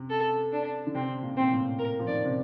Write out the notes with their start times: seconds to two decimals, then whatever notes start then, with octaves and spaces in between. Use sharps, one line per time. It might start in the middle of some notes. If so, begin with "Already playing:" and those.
Already playing: C3
0.10 A4
0.53 D4
0.87 D3
0.94 C3 C4
1.23 A#2
1.31 C3
1.37 A#2 C4
1.51 A2
1.79 A#4
1.99 F3
2.07 D#3 D5
2.25 C3